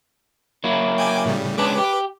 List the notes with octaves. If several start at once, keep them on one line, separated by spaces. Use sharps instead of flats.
F#3 A#3 E4
G5 G#5 D6
A2 C#3 G3
G#3 C#4 D4 B4 D6
G4